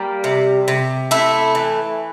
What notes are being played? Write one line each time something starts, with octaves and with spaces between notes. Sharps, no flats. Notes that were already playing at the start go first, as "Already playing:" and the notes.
Already playing: G3 A#3 G4
C3
C3
A3 E4
E3